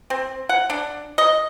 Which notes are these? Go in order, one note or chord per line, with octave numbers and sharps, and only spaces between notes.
C4
F#5
D4
D#5